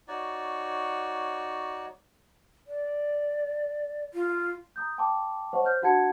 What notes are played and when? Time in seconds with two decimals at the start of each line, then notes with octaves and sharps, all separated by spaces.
0.08 D#4 F#4 C#5 D5
2.67 D5
4.14 F4
4.76 A#5 D#6 G6
4.98 G5 A5 C6 D6
5.53 C5 C#5 D#5 F#5 A5 C#6
5.64 C5 F6 G6
5.82 D4 F#4 F#5 A5 G#6 C#7